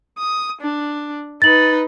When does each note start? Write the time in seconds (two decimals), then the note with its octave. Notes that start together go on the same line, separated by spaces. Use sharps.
0.18 D#6
0.61 D4
1.42 D#4 B4 A6 F#7